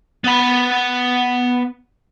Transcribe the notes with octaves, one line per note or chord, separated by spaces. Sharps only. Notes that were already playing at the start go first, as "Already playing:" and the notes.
B3 B5